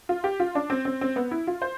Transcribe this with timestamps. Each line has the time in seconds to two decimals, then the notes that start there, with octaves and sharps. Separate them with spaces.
0.09 F4
0.24 G4
0.40 F4
0.55 D4
0.70 C4
0.85 C4
1.01 C4
1.16 B3
1.31 E4
1.47 F4
1.62 C5